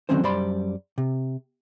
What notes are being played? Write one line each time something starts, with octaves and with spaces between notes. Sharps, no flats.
D3 D#3 F#3 C4 C#4 C5
F#2 G3 C5 D5 B5 C6
C3